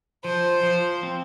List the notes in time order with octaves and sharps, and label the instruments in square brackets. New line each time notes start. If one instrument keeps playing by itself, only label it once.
[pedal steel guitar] F3 [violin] C5
[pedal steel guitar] F3
C4